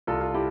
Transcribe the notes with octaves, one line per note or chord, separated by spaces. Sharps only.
C2 F4 A4
F4
E4 G4